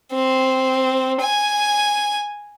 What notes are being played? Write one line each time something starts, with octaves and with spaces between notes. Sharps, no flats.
C4
G#5